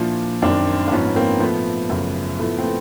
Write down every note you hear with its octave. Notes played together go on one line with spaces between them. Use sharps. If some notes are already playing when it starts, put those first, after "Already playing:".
Already playing: A#2 F3 D4 E4
F#2 D#3 C4 D4
D4
G#2 F3 B3 C#4
B3
A#3 C4
A#2 F3 A3 B3
F#2 C#3 F3
A2 F3 A3 B3
C4
A3 B3